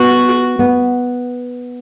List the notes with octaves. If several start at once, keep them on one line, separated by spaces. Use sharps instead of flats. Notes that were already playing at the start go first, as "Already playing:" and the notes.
Already playing: B3 F#4
B3